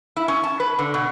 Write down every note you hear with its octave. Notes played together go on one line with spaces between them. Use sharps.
E4
C#4
A5
B4
D3
B2